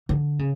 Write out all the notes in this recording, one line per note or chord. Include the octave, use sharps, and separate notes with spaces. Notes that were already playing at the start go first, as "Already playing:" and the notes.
D3
C#3